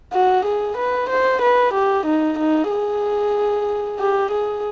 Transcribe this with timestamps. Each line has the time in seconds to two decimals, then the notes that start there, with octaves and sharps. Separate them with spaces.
0.13 F#4
0.45 G#4
0.77 B4
1.10 C5
1.42 B4
1.74 G4
2.06 D#4
2.39 D#4
2.71 G#4
3.99 G4
4.31 G#4